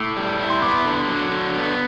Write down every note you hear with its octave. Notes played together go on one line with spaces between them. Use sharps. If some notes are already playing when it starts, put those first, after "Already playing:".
Already playing: A2 D6 E6
G3
E4
C6
B3 D6
D3
F#3
D3
B3